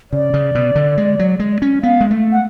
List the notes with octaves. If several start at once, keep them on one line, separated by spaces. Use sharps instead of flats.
C#3 D5
C#3
B2
D3
G#3
F#3
G#3
C#4
B3 F5
G#3
A3
F#5